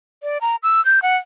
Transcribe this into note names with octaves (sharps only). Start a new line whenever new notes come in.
D5
A#5
E6
G6
F#5